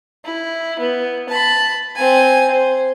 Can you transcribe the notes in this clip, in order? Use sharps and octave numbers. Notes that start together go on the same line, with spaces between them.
E4
B3
A5 B5
C4 G#5
C5